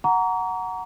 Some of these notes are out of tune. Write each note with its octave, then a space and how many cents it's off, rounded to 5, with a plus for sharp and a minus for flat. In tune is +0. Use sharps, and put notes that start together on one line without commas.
F#5 +0 A#5 +0 C#6 +45